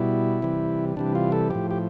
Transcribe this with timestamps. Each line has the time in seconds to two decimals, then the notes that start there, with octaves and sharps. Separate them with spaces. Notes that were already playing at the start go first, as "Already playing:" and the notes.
Already playing: B2 G3 E4
0.42 C3 E3 G3
0.96 C3 E3 G3 D4
1.15 F4
1.32 A4
1.50 A2 F3 G4
1.71 G4